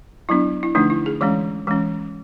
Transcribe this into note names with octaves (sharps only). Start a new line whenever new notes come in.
F#3 B3 D4 E4
E4
D3 F3 A3 D4 D#4
E4
G#4
E3 G#3 C#4 D5
E3 G#3 C#4